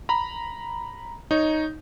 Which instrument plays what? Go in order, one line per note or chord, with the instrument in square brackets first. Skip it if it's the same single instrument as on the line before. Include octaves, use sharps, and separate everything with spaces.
[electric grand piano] A#5 B5
D#4 C#5